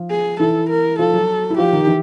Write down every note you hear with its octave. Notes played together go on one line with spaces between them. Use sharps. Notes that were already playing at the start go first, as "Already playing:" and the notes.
Already playing: F3 F4
G#4
E3 E4 A4
A#4
F3 F4 A4
F#3 F#4
E4
F3 F4 G4
D#3 D#4
E3 E4